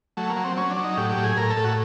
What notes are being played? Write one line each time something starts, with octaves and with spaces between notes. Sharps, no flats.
F#3 A3
A#3
F#3
C4
F#3 C#4
D4
F#3
D#4
A2 G4
G4
A2
G#4
A2 A#4
A4
A2
F#4